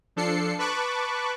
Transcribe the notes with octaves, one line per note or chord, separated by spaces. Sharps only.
F3 D4 A4 C7 C#7
B4 A5 B5 C#6 D6 F#6